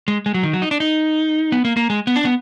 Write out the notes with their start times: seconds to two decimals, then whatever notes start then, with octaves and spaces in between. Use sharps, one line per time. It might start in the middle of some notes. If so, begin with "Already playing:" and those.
0.08 G#3
0.26 G#3
0.34 F#3
0.44 D#3
0.53 F#3
0.62 D#4
0.71 D4
0.80 D#4
1.52 B3
1.65 A#3
1.77 A#3
1.90 G#3
2.07 B3
2.16 D4
2.25 B3